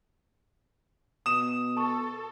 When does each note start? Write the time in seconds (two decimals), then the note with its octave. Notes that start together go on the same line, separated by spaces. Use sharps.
1.26 B2 D#6 E7
1.77 A4 A5 C#6